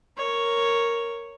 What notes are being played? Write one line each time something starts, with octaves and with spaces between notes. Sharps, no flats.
A#4 C#5